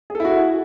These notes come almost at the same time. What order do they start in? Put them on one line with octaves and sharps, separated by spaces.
G#4 A4 E4 F#4